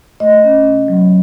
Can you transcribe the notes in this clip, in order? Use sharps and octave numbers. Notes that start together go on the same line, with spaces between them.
A3 D#5
C#4
C3
F#3